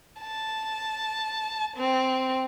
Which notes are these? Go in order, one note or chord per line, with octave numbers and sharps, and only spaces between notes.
A5
C4